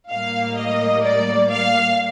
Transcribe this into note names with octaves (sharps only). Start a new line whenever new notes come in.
A2 G3 A#3 F5
D#5
D5
F5